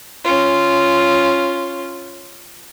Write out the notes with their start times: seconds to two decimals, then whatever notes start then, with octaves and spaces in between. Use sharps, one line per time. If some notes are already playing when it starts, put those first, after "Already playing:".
0.24 C#4 F4